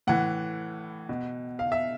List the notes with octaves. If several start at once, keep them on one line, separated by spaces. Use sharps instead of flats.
A2 E3 F#5
B2
F5
E5